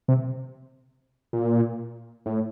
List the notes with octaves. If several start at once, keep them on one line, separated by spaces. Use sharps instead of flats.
C3
A#2
A2